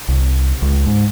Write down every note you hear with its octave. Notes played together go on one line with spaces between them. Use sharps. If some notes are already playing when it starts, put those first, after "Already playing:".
C2
C#2
G#2